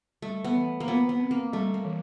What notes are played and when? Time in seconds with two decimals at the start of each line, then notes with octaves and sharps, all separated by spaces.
0.22 G3 A3
0.44 B3
0.55 E3
0.80 A#3
0.87 B3 F4
1.09 B3
1.20 C4
1.31 A#3
1.53 G3 A3
1.74 A#3
1.85 E3